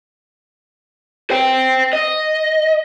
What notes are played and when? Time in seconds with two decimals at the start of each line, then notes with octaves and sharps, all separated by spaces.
1.30 C5 G5
1.93 D#5